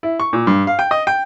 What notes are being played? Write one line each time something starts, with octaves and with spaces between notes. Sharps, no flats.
E4
C#6
A#2
G2
F5
G5
D#5
G5